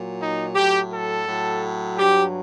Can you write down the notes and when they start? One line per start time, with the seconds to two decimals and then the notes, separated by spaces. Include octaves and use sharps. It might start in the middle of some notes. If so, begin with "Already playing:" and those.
Already playing: A#2 F#3
0.20 D#4
0.55 A2 F#3 G4
0.91 A4
1.27 A2 F#3
1.98 G2 F#3 G4